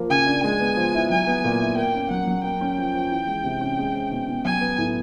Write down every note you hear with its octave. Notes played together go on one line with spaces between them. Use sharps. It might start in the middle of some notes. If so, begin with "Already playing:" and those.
Already playing: F3 A#3
C#3 G#5
D4
G#3 G#5
B3
F3
E4
F#3 G#5
B3
A#2
E4
A#3 G5
C#4
F#3 F#5
F#3
A#3 G5
C#4
F3
F3
E3
G#3
C3
C#4
G#3
C4
B2
B2
F#3 G#5
B3
A2